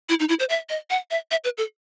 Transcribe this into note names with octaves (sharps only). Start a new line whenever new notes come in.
E4
D#4
E4
C5
E5
D#5
F#5
E5
E5
B4
A4